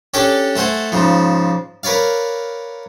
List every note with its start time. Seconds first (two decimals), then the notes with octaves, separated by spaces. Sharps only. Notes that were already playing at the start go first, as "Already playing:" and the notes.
0.14 C#4 D4 G4 A4 C#5 D5
0.56 A3 A4 C5 F#5 G#5
0.92 G#2 C#3 F3
1.83 A#4 B4 C#5 D5 F5